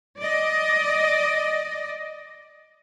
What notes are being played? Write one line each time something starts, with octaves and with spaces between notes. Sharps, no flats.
D5 D#5